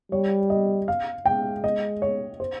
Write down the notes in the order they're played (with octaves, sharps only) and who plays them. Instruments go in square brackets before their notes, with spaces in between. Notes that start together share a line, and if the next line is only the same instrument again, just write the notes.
[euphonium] G3 [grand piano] C#5
[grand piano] D#5
F5
[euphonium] G#3 [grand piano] G5
[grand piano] D#5
C#5
C5